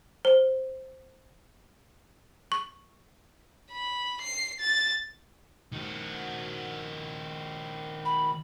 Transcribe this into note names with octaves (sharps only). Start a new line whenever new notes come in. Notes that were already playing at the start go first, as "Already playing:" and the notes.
C5
C#6
B5
C7
A6
D#3 F#4
B5